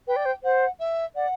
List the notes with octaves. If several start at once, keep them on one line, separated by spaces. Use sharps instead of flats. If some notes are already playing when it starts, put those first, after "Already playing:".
B4 G5
D5
C5
C5 F#5
E5
D5 F#5